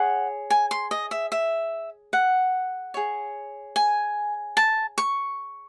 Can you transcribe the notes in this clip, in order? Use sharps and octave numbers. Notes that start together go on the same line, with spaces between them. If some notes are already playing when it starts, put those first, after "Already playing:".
Already playing: G#4 C#5 F#5
G#5
C6
D#5
E5
E5
F#5
G#4 C#5
G#5
A5
C#6